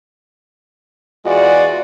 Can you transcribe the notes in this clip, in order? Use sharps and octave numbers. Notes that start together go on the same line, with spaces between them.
E2 G#3 F4 F#4 D5